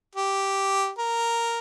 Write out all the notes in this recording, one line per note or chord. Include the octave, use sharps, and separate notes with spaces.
G4
A#4